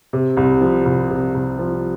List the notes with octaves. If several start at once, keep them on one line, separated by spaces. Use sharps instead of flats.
C3
C2
F3
C2
C3
C2
F3